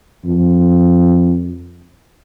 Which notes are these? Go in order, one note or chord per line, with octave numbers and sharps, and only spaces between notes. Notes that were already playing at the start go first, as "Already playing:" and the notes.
F2